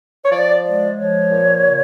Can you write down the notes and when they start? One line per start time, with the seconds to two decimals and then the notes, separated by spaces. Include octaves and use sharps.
0.24 C#5
0.30 F3 D5
0.64 G#3 D5
0.97 F3 C#5
1.30 A#2
1.63 C#3